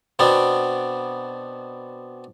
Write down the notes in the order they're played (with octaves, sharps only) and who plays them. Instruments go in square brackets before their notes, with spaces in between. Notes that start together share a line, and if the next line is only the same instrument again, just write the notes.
[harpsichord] B2 B3 C4 D4